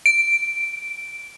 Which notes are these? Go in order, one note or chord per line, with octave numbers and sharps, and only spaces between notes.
D7